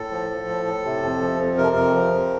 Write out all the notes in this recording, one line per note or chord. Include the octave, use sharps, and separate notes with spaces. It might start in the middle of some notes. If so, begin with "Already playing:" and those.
Already playing: A2 A4
F3
F3
A2
A2
C3
F2
F3
F2
C3 A#4
F2
F3
F2